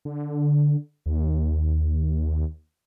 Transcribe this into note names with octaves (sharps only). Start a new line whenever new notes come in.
D3
D#2